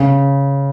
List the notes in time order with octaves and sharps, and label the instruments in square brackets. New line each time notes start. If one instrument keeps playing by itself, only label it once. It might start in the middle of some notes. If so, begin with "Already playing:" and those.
Already playing: [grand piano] C#3